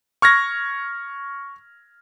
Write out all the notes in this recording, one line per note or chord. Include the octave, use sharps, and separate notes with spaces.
C#6 F6 G#6 A#6